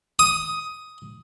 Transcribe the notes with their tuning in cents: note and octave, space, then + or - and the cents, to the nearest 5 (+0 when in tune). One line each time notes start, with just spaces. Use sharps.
D#6 +10